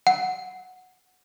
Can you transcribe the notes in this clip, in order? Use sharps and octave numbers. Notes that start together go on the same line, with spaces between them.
F#5